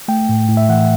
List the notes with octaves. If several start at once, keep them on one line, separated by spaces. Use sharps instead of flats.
A3 G5
A2
A2
E5
E3 F#5